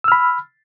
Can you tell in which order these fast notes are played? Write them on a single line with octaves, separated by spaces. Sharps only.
E6 F6 B5